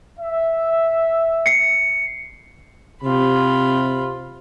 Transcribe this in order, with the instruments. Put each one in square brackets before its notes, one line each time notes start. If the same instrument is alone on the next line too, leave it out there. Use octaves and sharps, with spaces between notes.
[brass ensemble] E5
[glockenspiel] C7 C#7
[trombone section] C3 [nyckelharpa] F4 B5